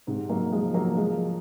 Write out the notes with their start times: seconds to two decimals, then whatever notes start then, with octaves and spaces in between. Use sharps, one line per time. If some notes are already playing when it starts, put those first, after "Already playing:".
0.07 G#2 C3
0.29 F#3 A#3
0.52 F3 G#3
0.74 F#3 A#3
0.96 F3 G#3